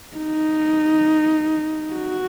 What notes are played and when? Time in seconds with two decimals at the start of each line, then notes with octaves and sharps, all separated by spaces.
0.16 D#4
1.94 F#4